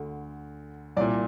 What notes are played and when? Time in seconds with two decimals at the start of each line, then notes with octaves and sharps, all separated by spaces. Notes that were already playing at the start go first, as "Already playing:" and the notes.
Already playing: D2 D3
0.97 C2 D5
1.01 A#2